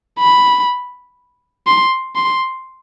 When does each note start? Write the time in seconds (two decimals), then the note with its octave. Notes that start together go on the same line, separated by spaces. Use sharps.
0.19 B5
1.67 C6
2.16 C6